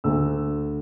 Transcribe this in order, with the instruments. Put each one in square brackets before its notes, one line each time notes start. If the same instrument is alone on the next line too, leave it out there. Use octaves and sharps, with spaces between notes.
[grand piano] D2 E6